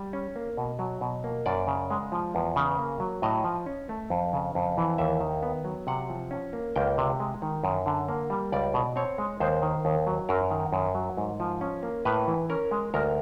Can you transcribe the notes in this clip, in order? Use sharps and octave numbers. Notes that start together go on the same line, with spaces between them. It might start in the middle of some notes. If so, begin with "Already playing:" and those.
Already playing: G3
C#4
A#3
B2
F#3
B2
A#3
F#2 D5
C#3
G#3
F3
E2
C#3
A#3
F#3
A2 D#5
F3
C#4
A3
F2
C#3
F2
E3
D#2 E5
D#3
B3
F#3
C3 F#5
F3
C#4
A#3
C#2 G5
C3
G#3
D#3
F#2
D3
A#3
G3
C#2 D5
B2
C4 C#5
G#3
D#2 C5
D#3
D#2
F#3
F#2 A#4
D#3
F#2
F#3
G#2
F3
C#4
A#3
A2 B4
E3
C#4 A#4
G#3
D2 A#4